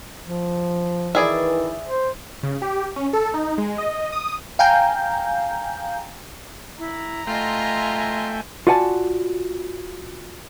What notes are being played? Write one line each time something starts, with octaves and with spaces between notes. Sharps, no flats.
F3
D#3 E3 E4 G#4 D5
C5
C#3
G4
C#4
A4
D#4
G#3
D#5
D#6
F5 G5 G#5 A#5 G6
E4 A#5
A3 F4 D#5 E5 G5 G#5 C6
F4 F#4 D5 F#5 G#5 A5